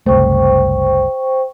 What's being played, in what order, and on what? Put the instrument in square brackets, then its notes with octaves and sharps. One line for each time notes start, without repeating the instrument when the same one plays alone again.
[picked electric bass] F#1 C2 A3 [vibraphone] C5 G5 C#6